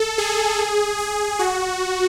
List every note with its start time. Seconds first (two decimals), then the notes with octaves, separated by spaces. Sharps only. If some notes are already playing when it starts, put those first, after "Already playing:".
Already playing: A4
0.18 G#4
0.99 G#4
1.39 F#4